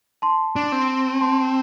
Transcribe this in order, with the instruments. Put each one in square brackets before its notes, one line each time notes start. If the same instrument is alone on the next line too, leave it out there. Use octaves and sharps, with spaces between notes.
[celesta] A5 C6
[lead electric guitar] D4
C4
[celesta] A5 C6